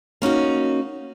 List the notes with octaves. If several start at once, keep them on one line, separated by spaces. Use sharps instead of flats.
A#3 C#4 D#4 F#4